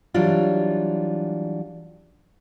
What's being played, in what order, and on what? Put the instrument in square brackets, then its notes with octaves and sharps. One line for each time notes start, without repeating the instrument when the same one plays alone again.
[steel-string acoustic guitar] E3 F#3 G3 D4 F4